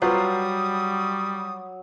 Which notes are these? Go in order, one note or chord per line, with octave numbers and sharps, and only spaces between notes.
F#3 G3 F4 B4 C5 D#6